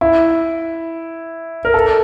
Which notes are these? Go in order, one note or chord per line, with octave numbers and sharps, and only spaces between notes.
E4
A#4
A4